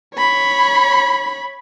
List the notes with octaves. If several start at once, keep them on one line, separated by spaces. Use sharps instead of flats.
C#5 B5